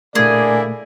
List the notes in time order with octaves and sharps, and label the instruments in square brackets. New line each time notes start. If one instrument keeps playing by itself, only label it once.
[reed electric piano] A#2 A3 [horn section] D3 A#3 E4 [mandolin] G#4 [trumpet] D5